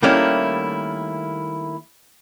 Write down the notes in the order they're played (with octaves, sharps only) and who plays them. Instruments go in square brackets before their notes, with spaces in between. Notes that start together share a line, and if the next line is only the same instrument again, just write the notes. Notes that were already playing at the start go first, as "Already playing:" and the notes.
[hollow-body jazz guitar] D#3 G3 A3 A#3 C#4 E4